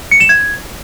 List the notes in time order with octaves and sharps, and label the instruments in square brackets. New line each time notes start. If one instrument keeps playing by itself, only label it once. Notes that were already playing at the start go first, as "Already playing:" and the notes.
[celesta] C#7
E7
G#6